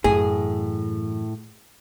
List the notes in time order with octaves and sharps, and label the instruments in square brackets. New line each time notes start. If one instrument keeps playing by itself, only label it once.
[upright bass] F#2 E3 [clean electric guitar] A2 [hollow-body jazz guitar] G#4